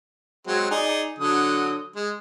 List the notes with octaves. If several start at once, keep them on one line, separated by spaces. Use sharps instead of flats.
F#3 G#3 C4
D#4 G#4 D5
D3 F#3 D#6
G#3